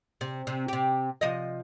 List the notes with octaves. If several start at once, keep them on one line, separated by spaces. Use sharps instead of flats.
C3
C3
C3 G4
C3 F3 D#5